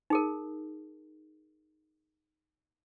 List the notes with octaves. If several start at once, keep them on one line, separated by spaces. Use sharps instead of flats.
D#4 G#4 A#4